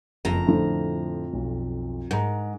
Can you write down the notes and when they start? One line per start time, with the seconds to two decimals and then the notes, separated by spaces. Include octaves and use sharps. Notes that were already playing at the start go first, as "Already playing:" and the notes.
0.25 F#1 F2 A#5
0.46 A2 D3 F3
1.33 B1
2.11 G#2 A#4 A#5